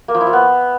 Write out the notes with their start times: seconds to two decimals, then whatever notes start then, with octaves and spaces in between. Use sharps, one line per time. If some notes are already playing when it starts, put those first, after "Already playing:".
0.08 A#3
0.15 F3
0.21 E4
0.27 F3
0.33 B3